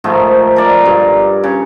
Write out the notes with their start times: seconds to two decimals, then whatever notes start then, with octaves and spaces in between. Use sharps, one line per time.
0.04 G#2 D#3 F3 A3
0.56 A#4 D5
0.86 G2
1.44 C#3